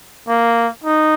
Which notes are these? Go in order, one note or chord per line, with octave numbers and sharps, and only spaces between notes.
A#3
D#4